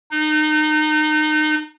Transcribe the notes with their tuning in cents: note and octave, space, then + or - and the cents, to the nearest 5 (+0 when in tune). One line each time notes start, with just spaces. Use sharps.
D#4 -25